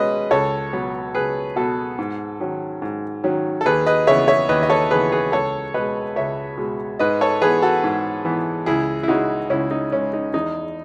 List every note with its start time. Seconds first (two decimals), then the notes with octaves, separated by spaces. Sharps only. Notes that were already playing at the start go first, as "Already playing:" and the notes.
Already playing: B2 G#3 C#4 B4 D#5
0.31 C#2 A4 C#5
0.73 B2 F#3 B3
1.15 C#2 G#4 B4
1.56 B2 F#3 B3 F#4 A4
1.99 G#2
2.40 D#3 F#3 C#4
2.82 G#2
3.24 D#3 F#3 C#4
3.61 A4
3.65 D#2 G#4 B4
3.86 B4 D#5
4.07 C#3 E3 B3 C#5 E5
4.28 C#5 E5
4.49 D#2 B4 D#5
4.63 D#5
4.70 A4 C#5
4.91 C#3 E3 B3 G#4 B4
5.12 G#4 B4
5.32 C#2 A4 C#5
5.74 B2 G#3 B4 D#5
6.16 C#2 C#5 E5
6.58 B2 G#3
6.99 G#2 B4 D#5
7.21 A4 C#5
7.41 E3 B3 G#4 B4
7.62 F#4 A4
7.84 G#2
8.25 E3 B3
8.66 C#2 E4 G#4
9.03 E4
9.08 C#3 G#3 D#4 F#4
9.50 C#2 C#4 E4
9.71 D#4
9.92 C#3 G#3 C#4
10.13 D#4
10.34 E2 D#4